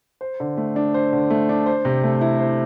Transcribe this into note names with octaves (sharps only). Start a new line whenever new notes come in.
C5
D3
A3
D4
C5
D3
A3
D4
C5
C3
A3
E4
C5